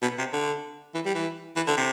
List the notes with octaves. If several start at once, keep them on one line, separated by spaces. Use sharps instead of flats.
B2
C3
D3
E3
G3
E3
E3
D3
C3